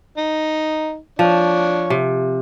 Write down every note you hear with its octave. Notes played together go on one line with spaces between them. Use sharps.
D#4
F3 D4 C#5
C3